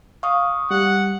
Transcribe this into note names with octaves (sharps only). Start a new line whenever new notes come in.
F5 C#6 D#6
G3 F#5